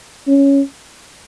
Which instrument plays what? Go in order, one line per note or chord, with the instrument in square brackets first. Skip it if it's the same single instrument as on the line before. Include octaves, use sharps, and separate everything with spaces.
[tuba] C#4